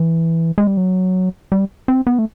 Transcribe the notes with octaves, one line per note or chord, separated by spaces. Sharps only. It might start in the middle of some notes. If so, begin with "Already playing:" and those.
Already playing: E3
G#3
G3
F#3
G3
C4
B3
A3